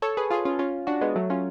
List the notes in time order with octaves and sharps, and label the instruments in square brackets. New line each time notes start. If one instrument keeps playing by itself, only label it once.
[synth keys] A4 C#5
G#4 B4
F4 G#4
C#4 F4
C#4 F4
D4 F#4
G#3 B3
F#3 A3
C#4 F4